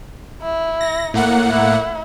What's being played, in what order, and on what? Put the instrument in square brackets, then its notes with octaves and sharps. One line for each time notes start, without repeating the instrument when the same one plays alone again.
[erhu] E4
[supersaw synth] A#6
A2 A#3 F#5
[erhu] E4